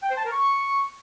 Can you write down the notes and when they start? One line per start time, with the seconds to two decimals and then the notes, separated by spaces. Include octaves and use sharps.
0.02 G5
0.10 C5
0.17 A5
0.24 A#4
0.32 C#6